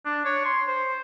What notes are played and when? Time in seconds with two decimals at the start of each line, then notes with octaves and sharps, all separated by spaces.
0.05 D4
0.25 C#5
0.45 C6
0.68 C5